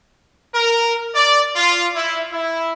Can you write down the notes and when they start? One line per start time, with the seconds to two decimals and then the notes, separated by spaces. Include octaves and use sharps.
0.54 A#4
1.15 D5
1.56 F4
1.95 E4
2.32 E4